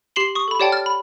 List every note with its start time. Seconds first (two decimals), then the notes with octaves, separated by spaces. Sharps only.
0.16 G4 C6 C7 F#7 G7
0.35 C#6 D#6
0.48 A4 B5
0.59 G4 C#5 D5 F#5 G5 A5
0.72 F6 A6
0.86 B5